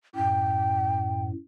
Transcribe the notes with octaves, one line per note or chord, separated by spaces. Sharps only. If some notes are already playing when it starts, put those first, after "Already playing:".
F#2 A2 G5